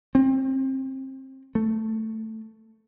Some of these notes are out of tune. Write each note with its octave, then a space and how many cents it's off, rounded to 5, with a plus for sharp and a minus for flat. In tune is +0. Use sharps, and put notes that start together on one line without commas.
C4 +25
A3 +5